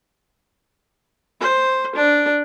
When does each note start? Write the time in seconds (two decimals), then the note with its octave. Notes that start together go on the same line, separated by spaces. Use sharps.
1.40 C5
1.95 D4